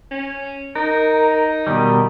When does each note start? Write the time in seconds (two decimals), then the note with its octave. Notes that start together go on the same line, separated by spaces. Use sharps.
0.11 C#4
0.76 D#4 A#4
1.67 B2 D#3 G3